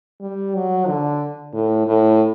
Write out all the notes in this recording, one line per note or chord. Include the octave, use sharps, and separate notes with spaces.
G3
F#3
D3
A2
A2